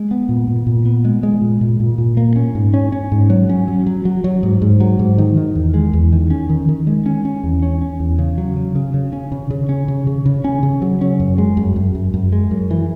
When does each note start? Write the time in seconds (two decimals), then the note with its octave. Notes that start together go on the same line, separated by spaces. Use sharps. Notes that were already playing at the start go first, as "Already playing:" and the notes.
Already playing: G#3
0.11 B3
0.29 A#2
0.48 A#2
0.67 A#2
0.86 B3
1.05 G#3
1.23 G#3
1.41 A#2
1.61 A#2
1.80 A#2
1.98 A#2
2.17 A#3
2.36 C#4
2.55 G#2
2.74 C#4
2.92 C#4
3.12 G#2
3.30 F#3
3.49 C#4
3.68 F#3
3.86 F#3
4.05 F#3
4.24 F#3
4.43 G#2
4.62 G#2
4.80 F#3
4.99 G#2
5.18 D#3
5.37 D#3
5.55 E2
5.74 G#3
5.93 E2
6.13 D#3
6.30 C#4
6.49 D#3
6.69 D#3
6.87 G#3
7.06 C#4
7.25 C#4
7.43 E2
7.62 C#4
7.81 C#4
8.00 E2
8.19 C#3
8.38 F#3
8.56 C#3
8.75 C#3
8.94 C#3
9.13 C#4
9.32 C#3
9.50 C#3
9.69 C#4
9.88 C#3
10.07 C#3
10.26 C#3
10.44 C#4
10.63 C#3
10.82 F#3
11.01 C#4
11.20 F#2
11.38 G#3
11.57 F#2
11.76 F#2
11.95 F#2
12.14 F#2
12.32 G#3
12.51 F#2
12.71 E3